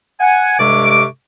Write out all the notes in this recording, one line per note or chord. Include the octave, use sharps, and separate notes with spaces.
F#5 G#5
G2 C3 G#3 A4 C#6 D6